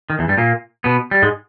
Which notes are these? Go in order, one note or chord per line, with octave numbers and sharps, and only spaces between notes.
D#3
E2 E3
G2 G3
A#2 A#3
B2 B3
G3
G#2 G#3